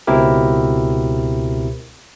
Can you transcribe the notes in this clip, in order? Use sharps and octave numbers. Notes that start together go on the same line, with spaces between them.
C#2 B2 C4 E4 G4 A#4